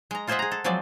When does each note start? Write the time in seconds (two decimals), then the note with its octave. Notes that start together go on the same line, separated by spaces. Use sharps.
0.11 G#3 A#5
0.27 F4 G#4 C5 D#5 E5 F#5
0.39 G#4 A#5
0.52 A4
0.64 F3 F#3 G#3 C4 D5